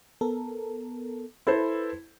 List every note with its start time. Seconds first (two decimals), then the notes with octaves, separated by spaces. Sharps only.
0.21 B3 A4 A#4
1.47 E4 A4 B4 C5